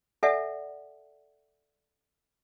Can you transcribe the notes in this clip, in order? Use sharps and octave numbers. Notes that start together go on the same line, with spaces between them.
A4 D5 E5 F#5 G#5